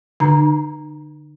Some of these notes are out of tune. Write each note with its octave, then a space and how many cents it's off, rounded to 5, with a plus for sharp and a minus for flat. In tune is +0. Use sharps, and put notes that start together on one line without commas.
D3 +0 D#4 -40 A#5 +0